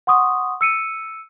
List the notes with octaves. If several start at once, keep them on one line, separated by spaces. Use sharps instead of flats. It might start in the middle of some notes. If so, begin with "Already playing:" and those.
F#5 C6 C#6 D#6
E6 C#7 D#7